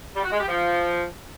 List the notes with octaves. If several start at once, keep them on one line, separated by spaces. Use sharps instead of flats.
G3
F#4
G#3
G4
F3